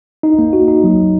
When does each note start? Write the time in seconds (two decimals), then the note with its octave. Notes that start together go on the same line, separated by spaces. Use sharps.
0.23 D#4
0.39 A#3
0.53 F#4
0.68 D#4
0.84 F#3